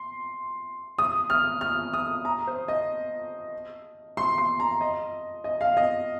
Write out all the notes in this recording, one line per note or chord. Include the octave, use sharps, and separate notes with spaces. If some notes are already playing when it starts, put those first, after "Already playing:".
Already playing: C6
D#6
F6
F6
D#6
A#5
C5
D#5
C6
C6
A#5
D#5
D#5
F5
D#5